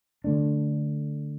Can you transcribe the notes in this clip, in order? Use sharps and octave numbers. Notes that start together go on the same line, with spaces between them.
D3 A3 D4